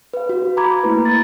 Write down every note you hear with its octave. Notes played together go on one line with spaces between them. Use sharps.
B4 F5
F#4
A#5 B5 D6 G#6
A3 A#3 E4 B4
A6